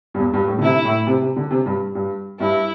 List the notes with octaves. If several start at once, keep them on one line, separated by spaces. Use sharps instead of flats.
G2
E2
G2
A2
D3
C3 E4
A2
C3
C3
D3
C3
G2
G2
G2 E4